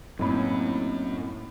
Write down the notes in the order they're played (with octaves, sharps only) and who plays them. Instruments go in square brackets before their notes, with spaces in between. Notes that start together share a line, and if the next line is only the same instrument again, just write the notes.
[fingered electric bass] F#2 [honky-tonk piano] A2 B5 [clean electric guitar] A#3 C4 D#4